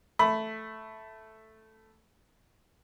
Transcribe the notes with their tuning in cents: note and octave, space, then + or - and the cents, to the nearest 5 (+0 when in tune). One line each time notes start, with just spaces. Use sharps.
A3 +0 B5 +10